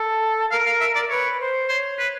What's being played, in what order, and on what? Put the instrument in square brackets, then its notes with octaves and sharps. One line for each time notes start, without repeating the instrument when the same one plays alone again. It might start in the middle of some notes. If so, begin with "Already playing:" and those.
Already playing: [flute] A4
[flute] A#4 [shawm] F5
[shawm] F5
E5
D5
[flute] B4 [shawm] C#5
[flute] C5
[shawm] C5 [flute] C#5
[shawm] B4